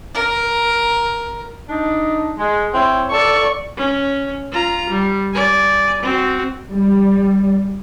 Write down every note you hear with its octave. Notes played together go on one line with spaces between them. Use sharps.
A#4
D4 D#4
G#3
C4 E4 C#5
A4 D5 C#6
C#4
F4 A#5
G3
D5 G#5
C4 F#4
G3